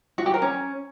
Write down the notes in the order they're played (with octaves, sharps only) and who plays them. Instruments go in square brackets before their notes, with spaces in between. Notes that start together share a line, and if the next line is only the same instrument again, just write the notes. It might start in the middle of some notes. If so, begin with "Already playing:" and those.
[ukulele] F#4
G4
A#4
C#4